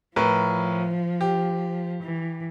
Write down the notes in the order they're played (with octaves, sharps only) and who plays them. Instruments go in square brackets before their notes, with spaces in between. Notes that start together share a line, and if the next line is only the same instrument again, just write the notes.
[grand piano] A2 A#4 B4 [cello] F3
[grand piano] G4
[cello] E3